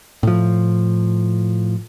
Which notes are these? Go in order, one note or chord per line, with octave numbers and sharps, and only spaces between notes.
A2 F3